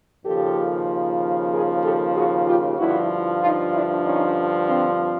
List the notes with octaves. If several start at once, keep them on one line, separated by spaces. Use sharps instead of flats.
D#2 C#3 F3 G4 A4
G#4 A#4
G4 A4
F#4 G#4
F4 G4
G2 D3 F3 E4 F#4
D#4 F4
D4 E4
C#4 D#4
C4 D4